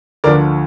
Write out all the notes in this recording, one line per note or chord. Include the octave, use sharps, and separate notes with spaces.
D2 D3 F3 A#4 D5